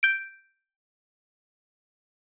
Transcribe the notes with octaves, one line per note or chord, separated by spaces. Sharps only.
G6 D7